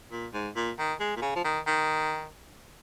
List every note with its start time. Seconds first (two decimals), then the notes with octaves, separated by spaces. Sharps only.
0.11 A#2
0.33 G#2
0.55 A#2
0.78 D#3
1.00 G#3
1.16 A#2
1.22 C#3
1.35 F3
1.44 D#3
1.66 D#3